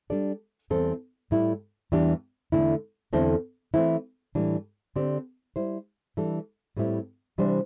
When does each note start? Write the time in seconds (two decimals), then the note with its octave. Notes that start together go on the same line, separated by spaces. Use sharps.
0.10 G3 D4 A4 D5
0.70 E2 E3 G3 C4 A4
1.31 A2 G3 E4
1.92 E2 E3 G3 D4 G4
2.52 E2 D3 A3 E4
3.13 E2 D3 C4 E4 A4
3.74 E3 A3 C4 E4
4.35 A2 E3 G3 D4
4.96 D3 C4 G4 D5
5.56 G3 E4 C5
6.17 E3 G3 D4 A4
6.77 A2 G3 C4 E4 G4
7.38 C3 E3 G3 D4 C5